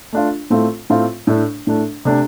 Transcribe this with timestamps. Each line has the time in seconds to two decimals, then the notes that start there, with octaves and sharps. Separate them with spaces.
0.13 A3 D4 F4
0.50 A2 A3 C4 F4
0.90 A2 A3 C4 F4
1.27 A2 A3 D4
1.67 A2 A3 D4
2.05 C3 A3 D4 G4